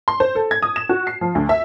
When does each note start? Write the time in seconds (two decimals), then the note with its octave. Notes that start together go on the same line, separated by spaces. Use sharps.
0.08 C6
0.20 C5
0.35 A4
0.51 G#6
0.62 D#6
0.76 E7
0.89 F#4
1.07 C7
1.21 F3
1.35 D2
1.49 E5